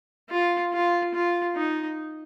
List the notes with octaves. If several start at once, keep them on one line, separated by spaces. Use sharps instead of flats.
F4
F4
F4
D#4